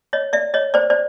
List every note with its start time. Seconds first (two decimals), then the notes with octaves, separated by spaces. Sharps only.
0.13 C#5 D#5
0.33 D5 E5
0.54 C#5 D#5
0.74 C5 D5
0.90 C5 D5